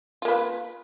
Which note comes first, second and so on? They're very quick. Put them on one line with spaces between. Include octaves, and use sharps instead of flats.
F4 A#3 B4